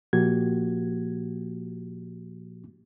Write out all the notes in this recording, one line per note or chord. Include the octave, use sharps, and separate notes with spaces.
A#2 F3 A#3 F#4 G4 G#6